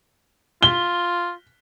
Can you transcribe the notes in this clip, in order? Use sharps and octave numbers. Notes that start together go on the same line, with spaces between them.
F4 G7